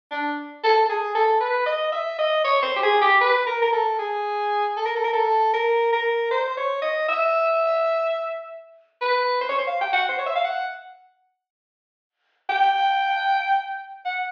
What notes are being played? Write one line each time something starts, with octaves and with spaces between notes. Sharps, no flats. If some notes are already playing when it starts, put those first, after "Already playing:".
D4
A4
A4
G#4
A4
B4
D#5
E5
D#5
C#5
C5
G4
G#4
G4
B4
A#4
A#4
A4
G#4
A4
A#4
A4
A#4
A4
A#4
A#4
C5
C#5
D#5
E5
B4
C5
C#5
C5
F5
G5
F#5
C5
C#5
E5
F5
F#5
G5
F#5